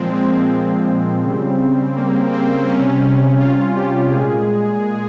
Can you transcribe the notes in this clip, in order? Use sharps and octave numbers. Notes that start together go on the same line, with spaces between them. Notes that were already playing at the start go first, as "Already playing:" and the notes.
Already playing: A#2 F3 G#3 C4
C4
C#3 G3
A#3
C4
C3 G3 C#4
F4
G4
A#2 G#3 G#4